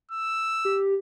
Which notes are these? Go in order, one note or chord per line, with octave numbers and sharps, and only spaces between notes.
E6
G4